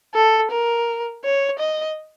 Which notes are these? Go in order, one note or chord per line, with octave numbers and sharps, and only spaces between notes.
A4
A#4
C#5
D#5